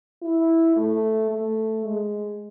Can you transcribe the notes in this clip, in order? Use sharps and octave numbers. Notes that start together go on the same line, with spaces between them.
E4
A3
A3
G#3